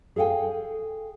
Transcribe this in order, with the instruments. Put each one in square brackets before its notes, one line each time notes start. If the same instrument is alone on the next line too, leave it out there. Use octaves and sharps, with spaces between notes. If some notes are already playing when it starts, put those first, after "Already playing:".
[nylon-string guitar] G#4 A4 F5 G5 G#5